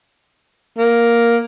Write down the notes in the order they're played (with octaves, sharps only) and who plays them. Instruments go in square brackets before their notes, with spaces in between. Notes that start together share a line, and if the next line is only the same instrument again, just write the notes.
[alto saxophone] A#3